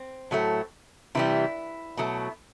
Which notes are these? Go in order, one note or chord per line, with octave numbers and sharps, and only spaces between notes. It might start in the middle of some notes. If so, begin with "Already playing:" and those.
Already playing: C4
A2 F#3 A3
C3 E3 G3 E4
B2 F#3 A3